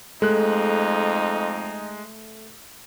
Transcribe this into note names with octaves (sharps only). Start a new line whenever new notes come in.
F2 G#3 A3 D#4 F#6